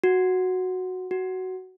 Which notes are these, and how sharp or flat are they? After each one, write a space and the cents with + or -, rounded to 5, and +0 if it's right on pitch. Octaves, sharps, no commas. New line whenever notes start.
F#4 -5
F#4 +10